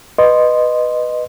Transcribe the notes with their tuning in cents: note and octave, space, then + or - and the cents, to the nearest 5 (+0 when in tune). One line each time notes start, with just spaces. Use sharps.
B4 +0 D#5 -15 C6 +0